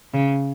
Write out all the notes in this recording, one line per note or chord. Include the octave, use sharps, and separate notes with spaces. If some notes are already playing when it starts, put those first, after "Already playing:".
C#3